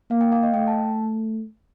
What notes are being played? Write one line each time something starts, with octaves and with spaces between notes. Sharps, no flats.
A#3 F5
G5
F5
D#5
A3 G5
A5